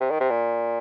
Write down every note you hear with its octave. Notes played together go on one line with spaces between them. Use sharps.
C3
D#3
C3
A#2